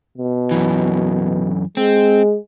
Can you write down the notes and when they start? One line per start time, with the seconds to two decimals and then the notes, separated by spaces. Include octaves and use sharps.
0.18 B2
0.51 F#2 E3
1.77 G#3 C4